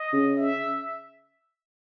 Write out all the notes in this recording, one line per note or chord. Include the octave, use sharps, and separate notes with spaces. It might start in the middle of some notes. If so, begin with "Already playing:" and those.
Already playing: D#5
C#3
E5